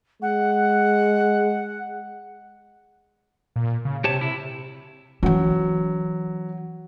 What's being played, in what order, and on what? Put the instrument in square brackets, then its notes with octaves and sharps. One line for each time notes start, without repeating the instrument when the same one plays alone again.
[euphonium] G#3 [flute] F#5
[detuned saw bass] A#2
C#3
[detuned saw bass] C3 [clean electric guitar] G4 C#5 A5
[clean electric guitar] E4
[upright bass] E3 C#4 [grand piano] F#3